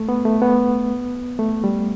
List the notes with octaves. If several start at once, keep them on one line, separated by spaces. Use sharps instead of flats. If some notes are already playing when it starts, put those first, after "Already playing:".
Already playing: A3
B3
A3
B3
A3
G3